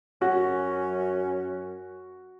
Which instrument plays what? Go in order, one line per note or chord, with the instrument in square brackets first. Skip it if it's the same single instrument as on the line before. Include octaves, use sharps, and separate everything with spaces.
[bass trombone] F#2 [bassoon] C#4 [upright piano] F#4